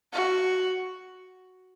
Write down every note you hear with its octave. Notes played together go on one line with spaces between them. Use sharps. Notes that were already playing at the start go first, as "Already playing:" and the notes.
F#4